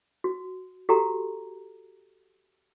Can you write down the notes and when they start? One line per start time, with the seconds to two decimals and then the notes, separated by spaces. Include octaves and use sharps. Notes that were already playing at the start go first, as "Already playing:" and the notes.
0.24 F#4
0.89 F#4 G4 A4 A#5